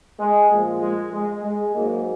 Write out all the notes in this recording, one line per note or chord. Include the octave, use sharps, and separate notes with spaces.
G#3
A#2 F3 G#3
G#3
G#3
G#3
G#2 F#3 A#3